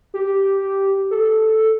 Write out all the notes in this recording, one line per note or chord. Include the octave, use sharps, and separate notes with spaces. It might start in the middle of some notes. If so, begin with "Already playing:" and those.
G4
A4